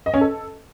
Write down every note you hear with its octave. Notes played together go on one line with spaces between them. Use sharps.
D#5
C#4
A4